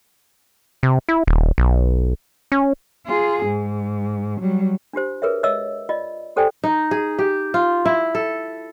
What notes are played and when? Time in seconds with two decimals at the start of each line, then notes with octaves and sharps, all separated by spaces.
0.83 C3
1.09 E4
1.27 D#1
1.58 B1
2.52 C#4
3.06 F4 G#4
3.45 G#2
4.41 F#3 G3
4.93 D4 F4 G4 C5
5.22 G#4 A#4 B4 C#5 E5
5.43 C#5 D#5 E5 E6
5.89 F4 D5 D#5
6.36 G4 A4 C5 D5 G5 G#5
6.64 D#4
6.91 G#4
7.19 G4
7.54 F4
7.85 E4
8.15 A4